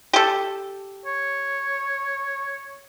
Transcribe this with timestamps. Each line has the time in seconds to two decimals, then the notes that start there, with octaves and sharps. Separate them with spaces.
0.13 G4 A4
1.06 C#5